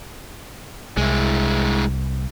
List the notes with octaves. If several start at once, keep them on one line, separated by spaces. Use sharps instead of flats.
C2 G#3 E4